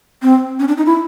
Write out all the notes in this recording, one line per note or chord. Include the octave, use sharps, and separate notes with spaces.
C4
C#4
D4
D#4
E4